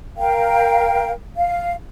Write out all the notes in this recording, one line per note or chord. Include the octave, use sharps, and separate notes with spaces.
A#4 F5 G5
F5